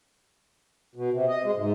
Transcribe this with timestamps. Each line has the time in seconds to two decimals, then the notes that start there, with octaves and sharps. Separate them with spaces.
0.96 B2
1.13 C3
1.29 D#5
1.44 G#3
1.56 G#2